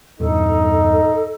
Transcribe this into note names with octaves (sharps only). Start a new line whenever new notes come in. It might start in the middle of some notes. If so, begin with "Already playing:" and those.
E2 G2 A#2 D#4 A4